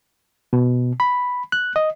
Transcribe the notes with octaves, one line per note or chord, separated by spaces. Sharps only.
B2
B5
F#6
D#5